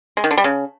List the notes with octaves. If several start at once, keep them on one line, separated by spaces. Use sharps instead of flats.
G#3
D#3
D3
G3
C#3